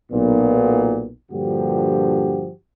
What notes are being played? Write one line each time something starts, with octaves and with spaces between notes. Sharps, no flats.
B1 A#2 B3
G2 A#2 D3 F3 F#4 G4